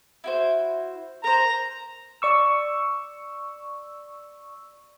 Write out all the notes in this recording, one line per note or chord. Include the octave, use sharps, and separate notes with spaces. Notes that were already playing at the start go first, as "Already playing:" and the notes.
E4 F#4 C5
A#4 C5 A#5
D5 C#6 E6